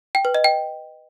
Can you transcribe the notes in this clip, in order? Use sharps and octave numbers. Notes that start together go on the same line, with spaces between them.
G5
B4
D#5
G5